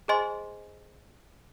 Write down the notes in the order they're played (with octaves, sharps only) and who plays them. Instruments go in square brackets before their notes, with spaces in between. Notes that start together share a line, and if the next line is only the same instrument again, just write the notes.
[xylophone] G#4 C5 D#5 G#5 C6